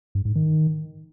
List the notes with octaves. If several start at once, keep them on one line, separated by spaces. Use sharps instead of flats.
G2
G#2
D#3